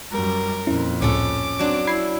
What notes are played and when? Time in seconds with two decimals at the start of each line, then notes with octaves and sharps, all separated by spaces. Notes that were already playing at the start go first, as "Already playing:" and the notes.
0.12 F#2 G3 A#4
0.67 F2 A#2 C#4 E4
1.02 C#2 A2 C#4 A4 D6
1.59 F#3 C4 D4
1.87 E4 B5 G#6 C7